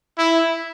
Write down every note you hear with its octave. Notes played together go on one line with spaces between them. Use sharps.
E4